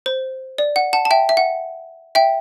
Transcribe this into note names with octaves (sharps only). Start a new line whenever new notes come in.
C5
D5
F#5
F#5 A5
A5
E5 G5
E5
F#5
E5 G5